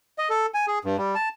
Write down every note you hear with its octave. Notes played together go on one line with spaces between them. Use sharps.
D#5
A4
G#5
G#4
G2
G3
A5